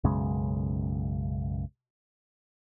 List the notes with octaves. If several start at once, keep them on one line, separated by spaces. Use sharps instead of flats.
B1 F#2 C#3 G#3